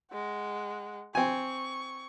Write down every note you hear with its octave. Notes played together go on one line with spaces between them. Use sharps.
G#3 F#5
C4 G#5 C#6